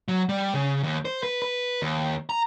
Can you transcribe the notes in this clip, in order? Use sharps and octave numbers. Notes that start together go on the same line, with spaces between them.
F#3
G3
C#3
D#2
C5
B4
B4
D#2
A#5